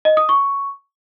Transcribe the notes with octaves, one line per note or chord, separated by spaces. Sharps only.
D#5
D#6
C#6